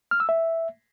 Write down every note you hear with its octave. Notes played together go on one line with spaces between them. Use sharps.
F6
E6
E5